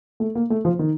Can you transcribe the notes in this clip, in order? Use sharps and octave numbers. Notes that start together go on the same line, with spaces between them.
A3
A#3
A3
F3
D#3